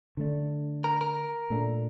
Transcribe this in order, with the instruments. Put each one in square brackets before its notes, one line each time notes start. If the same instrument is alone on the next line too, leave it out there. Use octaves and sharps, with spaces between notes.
[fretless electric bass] D3 A3 D4
[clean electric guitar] A#4
A#4
[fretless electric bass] A#2 A3 D4